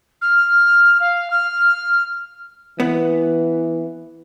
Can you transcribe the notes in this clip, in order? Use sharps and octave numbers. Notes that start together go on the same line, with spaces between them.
F6
F5
F6
E3 B3